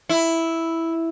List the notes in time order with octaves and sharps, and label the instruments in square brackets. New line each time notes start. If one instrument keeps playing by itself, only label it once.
[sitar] E4